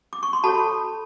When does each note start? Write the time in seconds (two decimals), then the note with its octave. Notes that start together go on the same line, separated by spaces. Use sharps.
0.13 D6
0.23 C#6
0.33 C6
0.44 F#4 A4 C#5 A5 B5